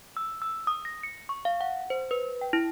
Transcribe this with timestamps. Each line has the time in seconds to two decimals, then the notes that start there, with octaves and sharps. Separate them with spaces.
0.17 E6
0.42 E6
0.67 D#6
0.85 A#6
1.03 C#7
1.29 C#6
1.45 F5
1.61 F#5
1.90 C5
2.11 B4
2.41 G5
2.53 E4